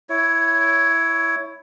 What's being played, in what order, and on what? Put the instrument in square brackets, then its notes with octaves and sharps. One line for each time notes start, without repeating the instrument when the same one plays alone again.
[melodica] E4 C#5